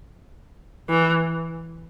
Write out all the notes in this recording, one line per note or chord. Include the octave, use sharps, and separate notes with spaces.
E3